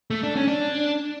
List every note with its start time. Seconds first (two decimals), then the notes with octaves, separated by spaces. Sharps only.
0.10 A3
0.23 D4
0.36 C#4
0.48 D4